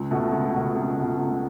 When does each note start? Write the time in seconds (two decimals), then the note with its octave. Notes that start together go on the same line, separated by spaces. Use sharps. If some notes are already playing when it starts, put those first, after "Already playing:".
Already playing: C#2
0.11 B2 A3
0.32 C#2
0.54 B2 A3
0.75 C#2
0.96 B2 A3
1.17 C#2